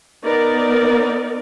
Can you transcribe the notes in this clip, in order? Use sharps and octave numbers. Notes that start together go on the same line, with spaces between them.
B3 D#4 A#4 D5